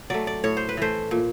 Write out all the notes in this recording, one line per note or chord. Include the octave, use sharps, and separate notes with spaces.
F#3 A3 D5
D5
A2 C#5
C5
B4
E3 A3 C5
A#2